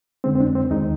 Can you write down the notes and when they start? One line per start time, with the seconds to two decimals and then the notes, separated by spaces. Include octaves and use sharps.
0.24 F2 D3 G#3 C4
0.35 C4
0.40 D4
0.55 C4
0.71 D#2 D#3 G#3 D#4